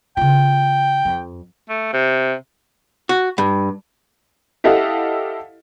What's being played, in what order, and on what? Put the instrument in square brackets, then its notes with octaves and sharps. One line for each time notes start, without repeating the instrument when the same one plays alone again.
[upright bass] C#3 F4 [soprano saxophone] G5
[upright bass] F2
[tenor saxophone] A3
C3
[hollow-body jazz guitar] F#4
G2
[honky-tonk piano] E4 G4 A4 D#5 F5 F#5